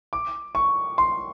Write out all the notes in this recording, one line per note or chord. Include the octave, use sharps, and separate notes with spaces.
D6
C#6
C6